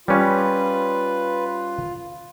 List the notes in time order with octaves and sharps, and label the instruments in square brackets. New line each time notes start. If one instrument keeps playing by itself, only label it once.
[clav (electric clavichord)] G3 C#4 [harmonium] F4 [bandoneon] B4